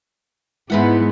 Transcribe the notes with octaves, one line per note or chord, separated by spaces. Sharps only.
G#2 G#3 B3 E4 B4 F#5